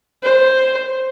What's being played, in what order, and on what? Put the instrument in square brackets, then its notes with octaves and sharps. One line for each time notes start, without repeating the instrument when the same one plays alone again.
[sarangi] C5